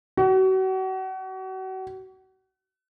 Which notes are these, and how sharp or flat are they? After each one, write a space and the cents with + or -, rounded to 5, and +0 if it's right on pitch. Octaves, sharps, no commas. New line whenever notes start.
F#4 +35